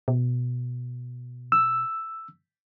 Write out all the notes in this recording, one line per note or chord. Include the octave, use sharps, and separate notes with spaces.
B2
E6